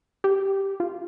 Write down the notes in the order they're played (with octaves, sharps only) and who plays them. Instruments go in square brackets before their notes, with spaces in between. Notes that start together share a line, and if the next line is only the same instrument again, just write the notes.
[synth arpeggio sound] G4
F4